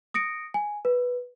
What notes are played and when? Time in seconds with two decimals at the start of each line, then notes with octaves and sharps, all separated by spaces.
0.14 D#6 A#6 C#7 D7
0.54 G#5
0.85 B4